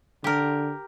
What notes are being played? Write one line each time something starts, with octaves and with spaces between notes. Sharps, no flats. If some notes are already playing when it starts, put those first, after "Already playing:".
D3 G4 A#4